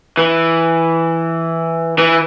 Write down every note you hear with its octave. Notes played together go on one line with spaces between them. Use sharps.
E3
E3